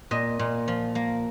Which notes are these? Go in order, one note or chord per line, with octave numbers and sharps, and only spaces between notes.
A#2 D#5
A#2
F3
A#3